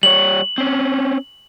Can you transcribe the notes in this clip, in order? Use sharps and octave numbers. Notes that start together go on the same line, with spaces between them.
G3 C#5 F#7
C4 C#4